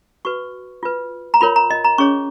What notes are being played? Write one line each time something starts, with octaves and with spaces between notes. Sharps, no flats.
F#4 B4 C#6
F4 B4
A#5
F4 A#4 C#5 B5
A#5
D#5
A#5
C#4 G#4 C#5 C#6